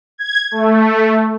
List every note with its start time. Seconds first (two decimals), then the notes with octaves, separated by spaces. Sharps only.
0.18 G#6
0.51 A3